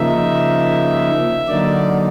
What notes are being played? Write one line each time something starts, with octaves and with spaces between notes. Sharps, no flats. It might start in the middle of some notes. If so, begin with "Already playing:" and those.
Already playing: C#3 F3 A#3 D#4 E5
D3 F#3 A#3 D#4 D5